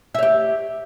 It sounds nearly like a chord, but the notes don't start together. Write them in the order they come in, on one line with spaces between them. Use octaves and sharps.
E5 C#5 G4